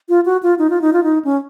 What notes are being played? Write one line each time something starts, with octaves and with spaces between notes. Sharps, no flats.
F4
F#4
F4
D#4
F4
D#4
F4
D#4
C#4